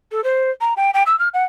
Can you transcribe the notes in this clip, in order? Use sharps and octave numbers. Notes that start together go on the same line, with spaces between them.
A4
C5
A#5
G5
G5
E6
F6
F#5